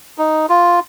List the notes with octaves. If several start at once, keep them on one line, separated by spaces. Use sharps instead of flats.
D#4
F4